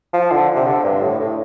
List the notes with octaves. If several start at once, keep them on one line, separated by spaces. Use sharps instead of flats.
F3
D3
C3
D3
G2
A2
A2